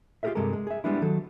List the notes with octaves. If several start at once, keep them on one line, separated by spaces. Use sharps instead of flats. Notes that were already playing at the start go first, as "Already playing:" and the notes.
F4 G4 G#4 A#4 B4 E5
G2 C3 G#3 G4 A4 A#4
G#3
G#4 E5
G3 G#3 B3 D4 E4
D#3 F#3 A4